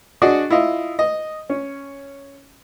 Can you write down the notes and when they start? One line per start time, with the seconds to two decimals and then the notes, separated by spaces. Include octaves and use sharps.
0.22 D4 F#4 G#4 D5 D#5
0.50 E4 F4 D#5
0.99 D#5
1.50 C#4